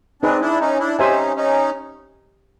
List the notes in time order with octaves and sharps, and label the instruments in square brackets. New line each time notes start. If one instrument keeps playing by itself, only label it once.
[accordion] C4 D4 [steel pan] D#4 G#4 B4
[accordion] D4 E4
C#4 D#4
D4 E4
[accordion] C#4 D#4 [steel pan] G4 C5 E5 G#5
[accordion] C#4 D#4